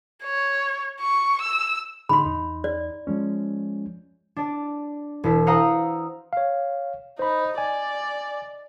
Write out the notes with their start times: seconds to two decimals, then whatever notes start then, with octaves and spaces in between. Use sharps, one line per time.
0.24 C#5
1.01 C#6
1.41 E6
2.09 A2 D3 D#4 B5 C6
2.25 E2 D#4
2.64 D5
3.07 F3 G#3 C#4
4.36 D4 D5
5.24 E1 E4 B6
5.46 C5 F5 F#5 A#5 D#6 E6
6.33 C#5 F5
7.19 D#4 C5 B5
7.58 D5 G#5